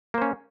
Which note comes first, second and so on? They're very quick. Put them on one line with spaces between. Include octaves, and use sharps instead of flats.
A#3 C5 C#4